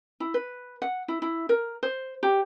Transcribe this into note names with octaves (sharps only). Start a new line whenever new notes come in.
E4
B4
F#5
E4
E4
A#4
C5
G4